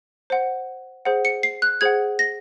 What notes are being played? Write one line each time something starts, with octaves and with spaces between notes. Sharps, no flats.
C5 F#5
G#4 C5 F#5
C#7
C7
F#6
G#4 C5 F#5 G#6
A#6